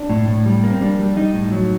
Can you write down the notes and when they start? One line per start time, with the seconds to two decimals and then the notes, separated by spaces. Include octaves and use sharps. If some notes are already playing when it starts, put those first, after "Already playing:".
Already playing: D4
0.10 A2
0.28 A2
0.46 G3
0.64 A#3
0.71 C4
0.81 G3 D4
0.99 G3
1.16 G3 D#4
1.34 A2
1.52 F#3